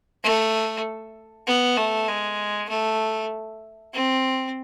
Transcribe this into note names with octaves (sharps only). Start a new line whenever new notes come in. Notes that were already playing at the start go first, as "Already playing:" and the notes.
A3
B3
A3
G#3
A3
C4